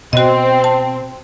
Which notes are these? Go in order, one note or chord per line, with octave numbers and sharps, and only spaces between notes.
B2 C4 F#4 D#5
A5